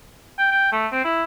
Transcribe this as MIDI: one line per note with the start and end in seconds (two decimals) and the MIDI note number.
0.38 0.47 79
0.51 0.67 79
0.72 0.87 57
0.92 1.03 60
1.05 1.24 64